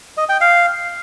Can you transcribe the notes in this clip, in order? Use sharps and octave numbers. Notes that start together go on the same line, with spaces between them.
D#5
G5
F5